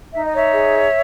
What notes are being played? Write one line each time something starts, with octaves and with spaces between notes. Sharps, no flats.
D#4 E5
D#5
C#5 E5
G#4